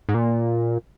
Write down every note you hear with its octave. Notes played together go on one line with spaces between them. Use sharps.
G#2
A#2